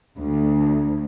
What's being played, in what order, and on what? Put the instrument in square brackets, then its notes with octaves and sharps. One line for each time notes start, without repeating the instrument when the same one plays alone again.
[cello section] D2 [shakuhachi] D4